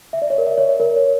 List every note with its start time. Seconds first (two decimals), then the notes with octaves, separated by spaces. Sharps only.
0.13 E5
0.22 D5
0.30 C#5
0.38 A#4
0.46 E5
0.58 C#5
0.69 C#5
0.80 A#4
0.96 C#5